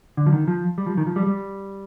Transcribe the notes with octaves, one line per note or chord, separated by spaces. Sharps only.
D3
F3
D#3
F3
G3
F3
D#3
F3
G3
G3